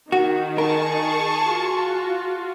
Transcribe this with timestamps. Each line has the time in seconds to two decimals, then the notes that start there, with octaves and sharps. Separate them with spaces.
0.12 D#3 F#4
0.58 G#4 A#4 A5 C#6
1.41 F4 F#4